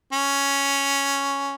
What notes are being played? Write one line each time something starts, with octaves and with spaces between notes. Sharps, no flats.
C#4